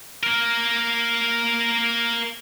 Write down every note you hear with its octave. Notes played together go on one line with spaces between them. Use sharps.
A#3 A#4